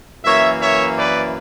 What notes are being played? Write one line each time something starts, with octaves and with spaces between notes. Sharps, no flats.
F#2 E3 A#3 C#5 E5
C#5 E5
B4 D5